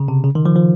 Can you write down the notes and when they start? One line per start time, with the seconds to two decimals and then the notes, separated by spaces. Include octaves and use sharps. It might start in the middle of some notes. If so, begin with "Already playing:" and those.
Already playing: C#3
0.08 C3
0.24 C#3
0.35 D#3
0.46 F3
0.56 F3